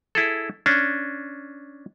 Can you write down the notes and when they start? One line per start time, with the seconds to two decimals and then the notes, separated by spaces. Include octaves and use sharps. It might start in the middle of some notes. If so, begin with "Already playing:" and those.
0.15 E4 G#4 A4
0.66 C#4 D4